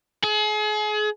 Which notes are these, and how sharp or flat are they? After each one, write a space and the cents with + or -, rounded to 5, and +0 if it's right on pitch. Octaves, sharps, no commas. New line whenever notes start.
G#4 +35